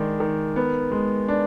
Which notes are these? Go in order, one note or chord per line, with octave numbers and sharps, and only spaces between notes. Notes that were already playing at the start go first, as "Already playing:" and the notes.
Already playing: D#3 G#3 D4
D#3
B3
G#3
D4